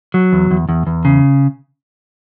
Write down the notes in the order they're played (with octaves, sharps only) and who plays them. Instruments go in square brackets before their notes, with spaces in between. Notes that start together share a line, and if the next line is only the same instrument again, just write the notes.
[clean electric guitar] F#3
E2
E2
E2
E2
C#3